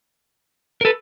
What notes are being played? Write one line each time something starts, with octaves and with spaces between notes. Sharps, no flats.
A#4
A4 B4